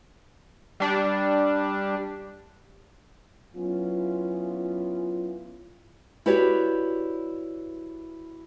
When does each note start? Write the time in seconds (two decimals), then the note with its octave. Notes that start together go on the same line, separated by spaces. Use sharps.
0.80 G3 D4
3.55 F#3 B3 C#4 E4 F4
6.26 E4 F#4 G4 B4 C#5 D5